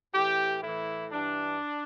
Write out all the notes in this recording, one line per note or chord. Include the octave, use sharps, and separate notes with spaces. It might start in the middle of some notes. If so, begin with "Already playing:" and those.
A2 E3 G4
A2 E3 E4
G2 E3 D4